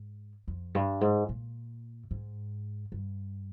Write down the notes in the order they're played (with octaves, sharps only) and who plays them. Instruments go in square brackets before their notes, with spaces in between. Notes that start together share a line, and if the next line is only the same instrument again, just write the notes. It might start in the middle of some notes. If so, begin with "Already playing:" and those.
Already playing: [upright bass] G#2
F2
G2
G#2
A#2
G#2
G2